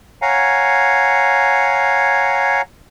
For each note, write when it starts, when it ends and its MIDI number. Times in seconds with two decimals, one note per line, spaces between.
0.22 2.61 73
0.22 2.61 77
0.22 2.61 78
0.22 2.61 80
0.22 2.61 82